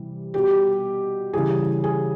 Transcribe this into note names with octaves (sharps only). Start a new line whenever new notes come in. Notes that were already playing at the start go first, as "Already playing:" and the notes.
Already playing: C3 E3 G3
B2 G3 G4
C#3 E3 G3 G#4
G#4